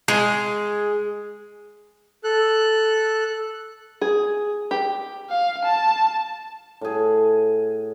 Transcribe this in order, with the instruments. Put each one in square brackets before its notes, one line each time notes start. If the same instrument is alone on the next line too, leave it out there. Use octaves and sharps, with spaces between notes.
[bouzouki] G#3
[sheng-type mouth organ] A4 F#6
[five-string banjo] G#4
G4
[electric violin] F5
A5
[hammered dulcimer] A2 G#4